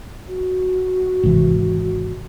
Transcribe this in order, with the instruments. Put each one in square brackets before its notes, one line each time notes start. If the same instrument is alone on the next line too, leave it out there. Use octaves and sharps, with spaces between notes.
[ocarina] F#4
[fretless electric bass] G#1 C3 E3